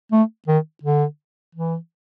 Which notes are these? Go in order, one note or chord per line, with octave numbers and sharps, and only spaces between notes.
A3
D#3
D3
E3